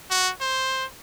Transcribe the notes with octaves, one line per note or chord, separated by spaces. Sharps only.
F#4
C5